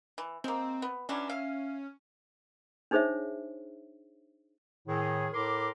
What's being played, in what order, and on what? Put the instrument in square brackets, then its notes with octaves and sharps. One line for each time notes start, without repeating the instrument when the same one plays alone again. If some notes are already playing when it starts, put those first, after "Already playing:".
[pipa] E3
[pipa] G#3 A#3 [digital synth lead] C4
[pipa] B3
[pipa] E3 F#3 D4 [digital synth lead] C#4
[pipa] E5 F5
[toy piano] D4 D#4 G#4 C5 C#5 E5
[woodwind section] A2 D#3 G#4
A2 A4 A#4 A#5 C6 D6